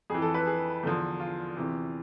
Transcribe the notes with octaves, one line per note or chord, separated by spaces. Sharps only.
F2 E3 G#4
A4
B4
G#4
E2 D3 F3
F4
E2 C3 E3